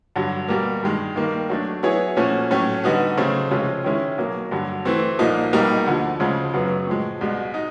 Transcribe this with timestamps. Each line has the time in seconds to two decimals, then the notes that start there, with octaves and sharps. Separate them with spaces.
0.16 G2 D3 F#3
0.48 B2 G3 A#3
0.83 G2 D#3 G#3
1.16 D#3 G3 A#3
1.49 F#3 A3 D4
1.83 F#3 B3 E4 G#4 C#5
2.16 A#2 F3 A3 C#4 F#4
2.51 A2 F#3 A3 C#4
2.84 D3 G3 B3 D#4 F#4
3.18 C#3 F#3 A3 C4
3.51 C3 F3 G#3 C#4 F4
3.84 D#3 G#3 C#4 E4
4.18 B2 F#3 A#3
4.51 G2 D3 F#3
4.85 E3 A3 C4
5.19 C2 A#2 F3 A#3 D#4
5.53 C#2 B2 G3 A#3 D#4
5.86 D2 D3 F3
6.20 D2 C#3 F3 G#3
6.54 F#2 C#3 F#3 B3
6.87 A2 F3 G#3
7.21 C2 B2 G#3
7.54 D#4